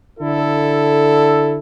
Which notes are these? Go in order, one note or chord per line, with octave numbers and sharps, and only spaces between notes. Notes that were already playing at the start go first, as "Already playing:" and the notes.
D3 E4 A4